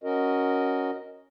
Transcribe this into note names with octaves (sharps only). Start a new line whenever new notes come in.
C#4 F#4 A#4 D#5